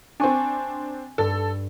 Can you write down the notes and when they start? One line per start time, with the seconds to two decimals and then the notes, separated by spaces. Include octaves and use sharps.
0.20 C4 D4 G#5 C#6
1.18 G2 A4